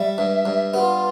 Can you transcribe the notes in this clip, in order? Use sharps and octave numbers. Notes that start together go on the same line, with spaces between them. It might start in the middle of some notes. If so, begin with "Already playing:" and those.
Already playing: G3 E5
G2
G2
B3 F4 G4